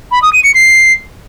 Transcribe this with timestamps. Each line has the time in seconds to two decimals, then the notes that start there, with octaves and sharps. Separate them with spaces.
0.11 B5
0.22 D#6
0.33 D#7
0.44 C#7
0.55 C7